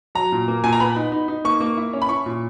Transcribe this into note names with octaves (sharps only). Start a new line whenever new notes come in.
F#3 A#5
A#2
A#3
A#2 G#5
A#5
B3 B5
D#4
D#4
D#4
A#3 C#6
A#3
E4
C#4
B5
E4 C#6
A#2